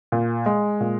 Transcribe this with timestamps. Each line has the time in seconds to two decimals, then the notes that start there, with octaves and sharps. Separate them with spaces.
0.12 A#2
0.46 G#3
0.80 A#2